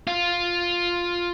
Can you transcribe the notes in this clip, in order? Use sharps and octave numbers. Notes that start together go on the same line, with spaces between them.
F4